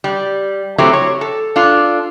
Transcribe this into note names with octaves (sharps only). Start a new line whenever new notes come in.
G3
F#3 A3 C4 E4 G4
C#5
A4
D4 F4 A4